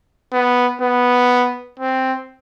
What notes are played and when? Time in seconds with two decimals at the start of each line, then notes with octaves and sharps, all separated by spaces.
0.33 B3
0.81 B3
1.80 C4